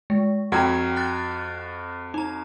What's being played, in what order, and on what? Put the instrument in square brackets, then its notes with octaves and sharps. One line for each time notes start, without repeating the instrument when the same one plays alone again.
[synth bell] G#3
[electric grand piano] F2 F#4 G#6 [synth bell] F#5 G5 A#5
[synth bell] F#6 A6
D#4 A#5